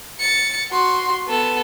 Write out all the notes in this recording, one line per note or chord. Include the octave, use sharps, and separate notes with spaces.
A6 C#7
F#4 C6
B3 A4